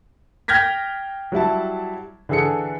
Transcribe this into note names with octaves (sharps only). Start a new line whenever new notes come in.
G5 F6 G6 G#6 A#6 B6
F#3 G3 E4 A5
D3 E3 G#4 A4 C#7